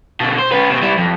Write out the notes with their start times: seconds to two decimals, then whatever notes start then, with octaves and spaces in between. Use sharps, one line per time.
0.21 B2 D3
0.39 C5
0.52 C#4 B4
0.70 B2 C4
0.83 G3 E4
0.98 F2